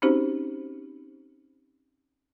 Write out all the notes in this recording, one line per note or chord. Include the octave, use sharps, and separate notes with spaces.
C4 C#4 D#4 F#4 G4 C5